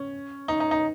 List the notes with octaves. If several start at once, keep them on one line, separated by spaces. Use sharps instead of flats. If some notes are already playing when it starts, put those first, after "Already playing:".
Already playing: C#4
D#4
D#4
D#4